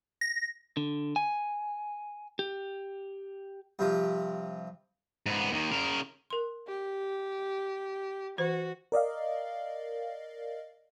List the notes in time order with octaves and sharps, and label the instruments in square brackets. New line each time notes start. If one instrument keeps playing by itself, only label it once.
[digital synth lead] A#6
[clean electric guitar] D3
G#5
G4
[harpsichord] G2 C3 F3
[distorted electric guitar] G#2 B3
D#2 D#3
C#3 A#4
[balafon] A#4 C6
[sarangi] G4
[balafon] E3 C5 [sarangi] F#4
[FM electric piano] A#4 D5 D#5 F5